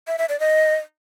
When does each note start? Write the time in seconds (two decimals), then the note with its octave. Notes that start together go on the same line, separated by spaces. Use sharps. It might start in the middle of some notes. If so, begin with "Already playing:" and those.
0.07 E5
0.18 E5
0.29 D5
0.40 D#5